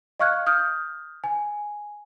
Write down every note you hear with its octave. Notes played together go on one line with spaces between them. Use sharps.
D#5 F5 C#6 F6 F#6 G#6
D#6 F6 G6
G#5